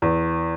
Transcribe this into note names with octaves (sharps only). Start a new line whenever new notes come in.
E2